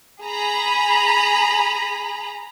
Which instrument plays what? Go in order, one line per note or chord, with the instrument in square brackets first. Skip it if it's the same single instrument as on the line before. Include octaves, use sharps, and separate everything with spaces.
[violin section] G#4 A#5 B5